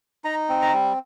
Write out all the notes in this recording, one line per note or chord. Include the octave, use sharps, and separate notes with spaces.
D#4 A#5
C4
A#5
G3